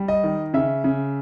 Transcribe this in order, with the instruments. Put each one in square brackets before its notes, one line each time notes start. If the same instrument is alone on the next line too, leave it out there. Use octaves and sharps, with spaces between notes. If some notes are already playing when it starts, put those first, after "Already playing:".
Already playing: [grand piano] G3
D#5
D#3
C#3 E5
C#3